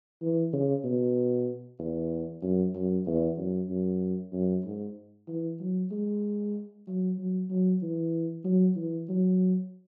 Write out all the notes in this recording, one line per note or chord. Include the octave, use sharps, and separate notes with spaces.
E3
C#3
B2
E2
F#2
F#2
E2
F#2
F#2
F#2
G#2
E3
F#3
G#3
F#3
F#3
F#3
E3
F#3
E3
F#3